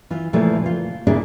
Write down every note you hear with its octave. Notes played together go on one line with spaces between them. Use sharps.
E3 F4
A#2 C#3 E3 F3 A3 F4
F4
A#2 C#3 C#4 D4 E4 G#4